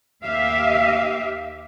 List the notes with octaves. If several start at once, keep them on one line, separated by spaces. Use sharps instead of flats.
D#2 G4 E5 F5